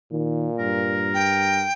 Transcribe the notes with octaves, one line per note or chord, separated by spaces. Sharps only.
A#2 D#3
G2 A#4
G5